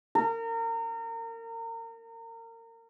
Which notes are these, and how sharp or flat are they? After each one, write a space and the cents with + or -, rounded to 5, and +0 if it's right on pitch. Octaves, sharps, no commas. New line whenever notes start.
A#4 -30